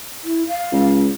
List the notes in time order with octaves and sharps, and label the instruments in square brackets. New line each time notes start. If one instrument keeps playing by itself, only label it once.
[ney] E4
F5
[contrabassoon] C#2